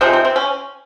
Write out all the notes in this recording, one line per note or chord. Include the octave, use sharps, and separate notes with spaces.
C3 F3 G#3 C4 D#4
C4
C4
C#4